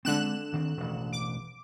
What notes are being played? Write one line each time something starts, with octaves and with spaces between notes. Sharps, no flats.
D3 G#3 B3 C4 F#6 E7
D2 D#3 C4
E1 A1
D6